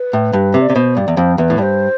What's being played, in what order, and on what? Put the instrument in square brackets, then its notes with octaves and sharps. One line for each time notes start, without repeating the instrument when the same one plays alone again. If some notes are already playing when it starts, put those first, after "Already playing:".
Already playing: [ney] B4
[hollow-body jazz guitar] A2
G2
C3
[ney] D5
[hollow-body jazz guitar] C3
[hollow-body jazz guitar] B2 [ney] C5
[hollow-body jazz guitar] G2 [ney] D5
[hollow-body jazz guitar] E2
[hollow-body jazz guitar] F2 [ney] C5
[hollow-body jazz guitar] E2 [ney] B4
[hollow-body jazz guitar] A2
[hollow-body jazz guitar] G2 [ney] D5
[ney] C5